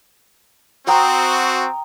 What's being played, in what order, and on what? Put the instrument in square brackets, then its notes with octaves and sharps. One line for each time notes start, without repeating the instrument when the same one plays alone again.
[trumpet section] C4 F#4 [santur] G5 A#5 D#6